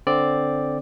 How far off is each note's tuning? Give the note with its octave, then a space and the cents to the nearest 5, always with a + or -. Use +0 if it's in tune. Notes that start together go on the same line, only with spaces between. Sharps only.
D3 +0 C4 +0 D5 +0